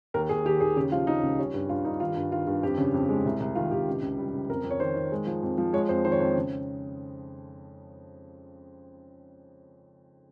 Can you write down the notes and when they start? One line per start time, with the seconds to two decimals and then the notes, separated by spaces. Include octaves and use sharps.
0.14 D#2 A#4
0.29 D#2 G#4
0.45 D#3 G4
0.61 D#2 G#4
0.76 C#3 G4
0.92 F3 F4
1.07 C#3 D#4
1.23 C#2
1.39 G3 C#4
1.54 G2
1.69 G2 F4
1.85 G2 D#4
2.00 D#3 F4
2.16 G2
2.32 D#3 F4
2.47 G2
2.63 F2 G4
2.78 C#3
2.94 F2
3.09 G#3
3.26 C2
3.40 C2
3.55 D#3 F4
3.71 C2 G4
3.87 C#2
4.02 C#2
4.18 G3
4.33 C#2
4.49 F2 A#4
4.64 F2
4.70 C#5
4.80 D#3 C5
4.95 D#3
5.12 G#3
5.27 F3
5.43 F2
5.58 F3
5.73 G#3 C#5
5.89 F2 C5
6.05 D#3 C5
6.12 C#5
6.20 F2 C5
6.36 C#3